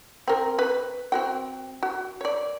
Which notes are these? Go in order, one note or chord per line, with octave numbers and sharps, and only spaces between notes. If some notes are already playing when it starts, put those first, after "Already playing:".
C4 A#4
B4
C4 F#4 G5
F#4
C#5 D5